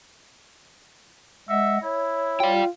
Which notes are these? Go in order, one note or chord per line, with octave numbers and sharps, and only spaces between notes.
G#3 D#5 E5 F#5
E4 C#5
F4 D5 G5